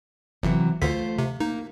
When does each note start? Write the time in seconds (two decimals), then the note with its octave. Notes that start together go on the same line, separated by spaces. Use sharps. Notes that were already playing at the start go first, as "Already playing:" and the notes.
0.43 G1 C3 E3 F#3
0.82 D2 D3 A3 F4 C5 B6
1.19 C3
1.40 A#3 D#4